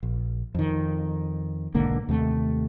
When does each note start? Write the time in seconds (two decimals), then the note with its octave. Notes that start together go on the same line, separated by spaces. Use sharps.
0.03 A#1
0.55 F2 D#3
1.75 B1 G#2 D3 A#3
2.09 D#2 C3 A3